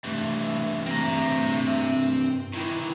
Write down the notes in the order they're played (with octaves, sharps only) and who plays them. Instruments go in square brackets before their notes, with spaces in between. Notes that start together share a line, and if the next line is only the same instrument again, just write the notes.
[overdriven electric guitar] G2 E3 [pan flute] A3
[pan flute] A3 [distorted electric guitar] C4 A#5
[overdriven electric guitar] D#3 E3 [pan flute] E4